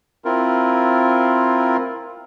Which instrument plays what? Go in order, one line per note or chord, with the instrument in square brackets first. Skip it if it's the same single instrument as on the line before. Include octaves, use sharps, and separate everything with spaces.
[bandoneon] C4 E4 F4 A#4